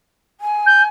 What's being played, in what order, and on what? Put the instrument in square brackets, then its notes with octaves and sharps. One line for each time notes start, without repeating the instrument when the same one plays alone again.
[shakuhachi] G#5
[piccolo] G6